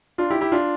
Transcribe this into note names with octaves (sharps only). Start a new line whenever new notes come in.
D4 F4
E4 G4
E4 G4
D4 F4